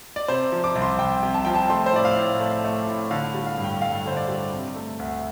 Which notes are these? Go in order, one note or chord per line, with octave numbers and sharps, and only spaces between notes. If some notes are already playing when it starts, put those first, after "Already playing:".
D5
C3 C5
F3
D6
C2
C6
C2 G5
C3
A5
F3 G5
A5
A3 C6
C5
A2 D5
F5
A2
A3
A3
A2
D3 F5
G3
F5
G2
G5
G2 F5
D3 C5
D5
G3
C3
A3
D2